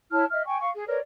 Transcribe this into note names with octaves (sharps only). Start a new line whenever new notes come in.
E4 C#5 A5 F6
D#5 E5 F6
G5 G#5 C#6
F5 C#6
G#4
A#4 B4 C#5 D5